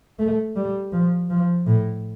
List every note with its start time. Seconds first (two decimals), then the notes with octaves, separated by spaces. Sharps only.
0.19 A3
0.56 G3
0.92 F3
1.30 F3
1.66 A2